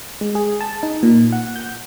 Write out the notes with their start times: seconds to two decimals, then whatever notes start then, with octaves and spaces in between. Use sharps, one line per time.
0.21 G#3
0.35 G#4
0.61 A5
0.83 D#4
1.03 A#2
1.33 F#5
1.56 G6